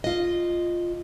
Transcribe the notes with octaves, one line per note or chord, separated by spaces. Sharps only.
F4 D#5